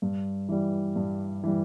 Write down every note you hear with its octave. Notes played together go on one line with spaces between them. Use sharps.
G2
E3 G3
G2
E3 G3